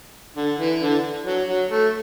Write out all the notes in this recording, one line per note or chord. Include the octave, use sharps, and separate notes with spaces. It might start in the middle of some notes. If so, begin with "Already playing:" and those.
D3
E3
D3
F#3
F#3
A3